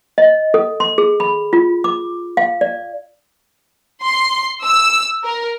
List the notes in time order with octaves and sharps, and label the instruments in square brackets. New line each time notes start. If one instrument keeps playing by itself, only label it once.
[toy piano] D#5
A4
C6
G#4
B5
F4
D6
F5
D5
[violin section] C6
E6
A#4